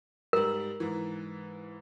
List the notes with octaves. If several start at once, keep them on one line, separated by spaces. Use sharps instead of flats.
G#2 G3 A#4
G#2 E3